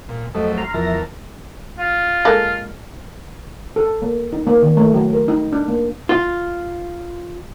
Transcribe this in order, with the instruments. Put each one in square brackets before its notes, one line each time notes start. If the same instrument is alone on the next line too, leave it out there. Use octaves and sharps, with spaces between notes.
[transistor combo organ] A#2
[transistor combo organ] F2 F#3 A3 [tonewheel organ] A4 D#5
[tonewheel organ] A#5 C6 F6
[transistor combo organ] E2 A#4 A5 [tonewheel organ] F3 E5 A#6
[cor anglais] F4
[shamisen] G#3 A#3 A4
[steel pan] A4
A#3
D#4
A#3
D#3
A3
F#3
A#4
D#4
D4
A#3
[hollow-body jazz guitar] F4